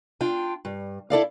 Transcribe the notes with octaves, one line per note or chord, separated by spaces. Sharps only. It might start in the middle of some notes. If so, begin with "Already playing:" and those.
D4 F4 G5
G2
E4 A4 D5 F5